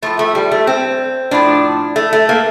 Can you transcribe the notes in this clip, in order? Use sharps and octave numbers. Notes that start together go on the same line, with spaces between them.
A2 F3 A3
A3
G3
A3
C4
A2 F3 D4
A3
A3
A#3